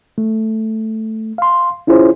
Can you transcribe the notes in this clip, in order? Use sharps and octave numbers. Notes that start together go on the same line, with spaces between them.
A3
F5 C6
C#4 E4 F4 G#4 C5 C#5